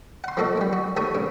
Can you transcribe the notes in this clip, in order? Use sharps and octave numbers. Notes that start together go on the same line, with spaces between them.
F#5 C6
F3 A#3 F#4 A4 D#5
F#2 G3
F#4
D#2 A3 A#4 C#5 D#6
G2 C#3